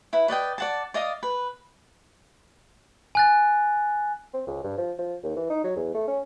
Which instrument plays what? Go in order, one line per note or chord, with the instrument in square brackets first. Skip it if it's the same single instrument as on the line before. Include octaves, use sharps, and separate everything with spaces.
[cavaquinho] E4 B4
B4 D5 D#5 G5
D5 F#5 A5
D5 D#5 F5 D#6
B4
[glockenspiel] G#5 F#6 A6
[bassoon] C4
C#2
G2
F3
F3
D#2
E3
D#4
F#3
E2
A3
C#4